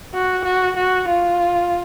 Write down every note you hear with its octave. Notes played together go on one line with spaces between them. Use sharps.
F#4
F#4
F#4
F4